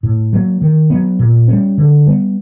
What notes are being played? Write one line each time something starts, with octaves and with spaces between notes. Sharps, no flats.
A2
F#3 A#3
D#3
F#3 B3
A#2
G3 A#3 C#4
D3
G3 B3